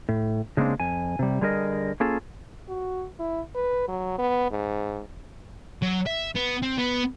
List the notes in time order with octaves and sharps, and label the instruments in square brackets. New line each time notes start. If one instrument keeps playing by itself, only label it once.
[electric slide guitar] A2
C#3 G#3 A#3 C4 D4
F2 G#5
C3 G3
D3 G3 G#4 A#4 D#5
A#3 C#4 F4 G#4 A4
[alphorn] F#4
E4
B4
F#3
B3
G#2
[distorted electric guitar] F#3
E5
B3
C4
B3